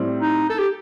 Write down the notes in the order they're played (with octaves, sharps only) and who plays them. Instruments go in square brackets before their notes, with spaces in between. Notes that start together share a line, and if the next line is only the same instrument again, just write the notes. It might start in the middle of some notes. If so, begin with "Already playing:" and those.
Already playing: [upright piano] A2 G3 C4
[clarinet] D#4
A4
G4